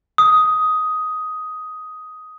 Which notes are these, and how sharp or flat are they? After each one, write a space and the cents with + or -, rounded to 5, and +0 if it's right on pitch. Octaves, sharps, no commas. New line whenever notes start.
D#6 +10